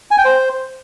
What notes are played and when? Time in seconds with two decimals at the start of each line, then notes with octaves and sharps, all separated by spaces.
0.11 G#5
0.18 G5
0.25 C5